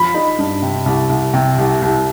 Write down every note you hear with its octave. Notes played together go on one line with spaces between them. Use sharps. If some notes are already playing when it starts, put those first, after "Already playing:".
Already playing: F3 B5
D#4
G2
C3
C2
C2
C3
C2
C2